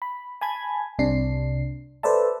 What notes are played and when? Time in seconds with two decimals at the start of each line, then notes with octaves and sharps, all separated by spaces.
0.02 B5
0.41 G#5 A5 B5 G#6
0.99 C2 C3 D4 C7
2.03 A4 B4 C5 D5 E5 A5